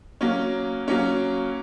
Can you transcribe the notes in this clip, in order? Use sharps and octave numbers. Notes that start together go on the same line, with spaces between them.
F#3 A#3 C#4
F#3 A#3 C#4